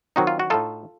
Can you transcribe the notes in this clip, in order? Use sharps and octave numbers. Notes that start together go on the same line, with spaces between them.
D#3 F#3 C4 D#4 F#4
F4
F#4
A2 A3 D#4 F4 A4